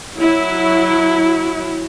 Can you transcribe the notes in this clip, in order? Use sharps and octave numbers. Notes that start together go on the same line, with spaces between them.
F#3 E4